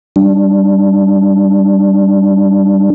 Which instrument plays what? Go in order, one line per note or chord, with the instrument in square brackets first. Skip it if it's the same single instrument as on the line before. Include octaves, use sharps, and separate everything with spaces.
[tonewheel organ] G3 D4